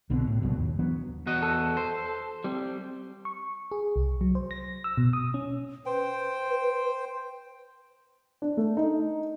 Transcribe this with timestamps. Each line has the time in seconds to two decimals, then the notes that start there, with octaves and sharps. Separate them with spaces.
0.10 B1 B2 D3 C4
0.27 A2
0.42 C2 G2 B2 F#3
0.57 D#2
0.79 E3 F#3 B3 D4
1.26 E2 F#4 D#5
1.43 A4
1.77 C5
2.44 G3 C4
3.25 C#6
3.72 G#4
3.96 C2
4.21 F#3
4.35 C5
4.51 A#6
4.84 E6
4.98 B2
5.13 D#6
5.34 C#4
5.86 B4 C5 G5
8.42 D4
8.57 A3
8.77 D#4